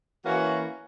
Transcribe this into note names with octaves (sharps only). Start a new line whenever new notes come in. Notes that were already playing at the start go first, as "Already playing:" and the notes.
E3 A#3 C#4 F#4